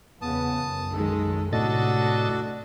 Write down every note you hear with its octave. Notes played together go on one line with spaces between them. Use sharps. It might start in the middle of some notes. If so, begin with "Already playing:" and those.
E2 C#3 B3 A5 D#6
B1 F#2
D#3 G#3 A4
A2 C3 A3 D4 F#4 A4 D#5 A6